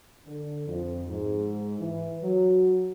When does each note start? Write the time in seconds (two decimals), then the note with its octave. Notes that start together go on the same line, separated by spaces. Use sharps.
0.27 D3
0.66 F2
1.09 G#2
1.80 E3
2.23 F#3